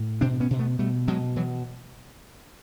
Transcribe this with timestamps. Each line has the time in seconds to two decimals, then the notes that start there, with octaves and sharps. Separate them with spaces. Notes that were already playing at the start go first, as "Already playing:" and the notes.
Already playing: A2
0.21 B2 C4 D4
0.40 B3 C#4
0.51 B2
0.59 A3 B3
0.79 B2 G3 A3
1.08 B2 F#3 G#3
1.36 B2 E3 F#3